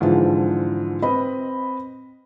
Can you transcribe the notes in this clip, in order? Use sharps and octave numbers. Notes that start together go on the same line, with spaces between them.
G#2 D3 E3 F3 F4
C4 B4 D#5 B5